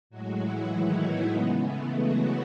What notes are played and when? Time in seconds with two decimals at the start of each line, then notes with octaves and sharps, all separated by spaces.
0.10 A2 F#3 G#3 F#4
0.41 E3 E4
0.72 D#3 D#4
1.03 B3
1.34 C#3 E3 G#3 B3
1.65 A3
1.96 F#3 F#4